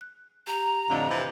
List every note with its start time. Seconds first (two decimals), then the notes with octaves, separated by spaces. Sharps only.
0.01 F#6
0.47 G4 A#5
0.90 F2 A2 D3 D5 D#5 F5
1.09 C3 E3 C4 B5